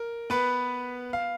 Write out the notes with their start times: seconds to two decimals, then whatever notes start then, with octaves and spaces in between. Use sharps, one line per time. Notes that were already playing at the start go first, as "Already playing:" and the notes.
Already playing: A#4
0.30 B3 B4
1.13 F5